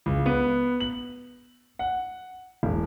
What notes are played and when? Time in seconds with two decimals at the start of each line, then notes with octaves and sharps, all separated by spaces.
0.06 C#2
0.26 B3
0.80 F#7
1.79 F#5
2.63 E1